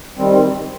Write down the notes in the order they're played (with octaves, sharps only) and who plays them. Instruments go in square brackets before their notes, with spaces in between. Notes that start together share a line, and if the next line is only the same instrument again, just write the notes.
[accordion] D#3 G3 C4